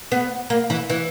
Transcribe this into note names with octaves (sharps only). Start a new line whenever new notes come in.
B3
A#3
E3
E3